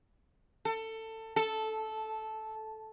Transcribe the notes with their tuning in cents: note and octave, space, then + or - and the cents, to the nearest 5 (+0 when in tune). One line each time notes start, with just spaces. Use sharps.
A4 +20
A4 -10